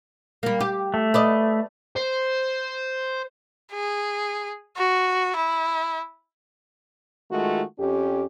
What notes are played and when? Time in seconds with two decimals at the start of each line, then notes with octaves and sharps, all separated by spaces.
0.43 G3 A#3
0.60 G4
0.94 A3
1.14 B4 D5 D#5
1.96 C5
3.72 G#4
4.77 F#4
5.36 E4
7.31 D#3 G#3 A3 F4 F#4
7.80 F2 C#4 G4